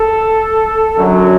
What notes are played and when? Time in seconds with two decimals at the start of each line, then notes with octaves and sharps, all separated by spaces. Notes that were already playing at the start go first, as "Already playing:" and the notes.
Already playing: A4
0.97 F#2 D3 F#3